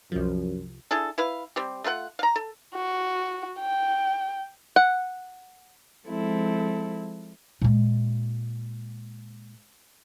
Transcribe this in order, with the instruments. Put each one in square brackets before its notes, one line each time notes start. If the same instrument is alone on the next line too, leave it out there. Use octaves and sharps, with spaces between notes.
[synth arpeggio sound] C2 F3 [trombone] F#2
[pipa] D4 E4 G#4 A4
E4 B4 F5
G3 C4 G4
A3 F4 A#4 F#5
F5 A#5
A4
[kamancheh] F#4
G5
[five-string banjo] F#5
[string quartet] F3 G#3 C4 E4 A4
[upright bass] A#2 G#3